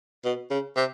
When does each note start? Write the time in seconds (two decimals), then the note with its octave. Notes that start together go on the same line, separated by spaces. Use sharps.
0.24 B2
0.50 C#3
0.76 C3